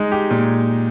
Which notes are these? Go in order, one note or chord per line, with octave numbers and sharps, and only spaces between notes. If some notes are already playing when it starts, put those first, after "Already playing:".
Already playing: G#3 D#4
G4
A#2